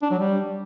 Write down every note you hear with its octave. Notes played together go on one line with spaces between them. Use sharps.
D4
F#3
G3